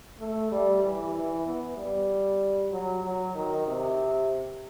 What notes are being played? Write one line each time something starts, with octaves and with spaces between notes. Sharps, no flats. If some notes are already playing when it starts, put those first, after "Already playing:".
A3
G3
E3
E3
B3
G3
F#3
F#3
D#3
C3